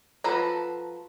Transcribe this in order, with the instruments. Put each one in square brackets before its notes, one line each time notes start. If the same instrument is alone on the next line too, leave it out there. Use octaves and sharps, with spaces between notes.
[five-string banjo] F3 F#4 A4 B4 A#5